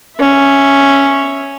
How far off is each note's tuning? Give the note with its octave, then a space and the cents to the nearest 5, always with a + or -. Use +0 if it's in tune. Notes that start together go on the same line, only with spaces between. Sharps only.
C#4 +0 E5 +0